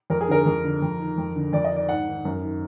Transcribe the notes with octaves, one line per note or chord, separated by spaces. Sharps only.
F2 A#4
G#4
D3 A#4
F2
D3
F2
D#3
F2
D3
F2 D5
D#5
D#3 D5
G#2 F#5
D#3
F#2
D#3